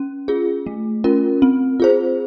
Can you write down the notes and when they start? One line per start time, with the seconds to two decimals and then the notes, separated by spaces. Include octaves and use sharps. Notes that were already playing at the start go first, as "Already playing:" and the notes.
Already playing: C#4
0.28 F4 G#4
0.66 A3
1.04 C#4 F4 A#4
1.42 C4
1.80 F4 G#4 C5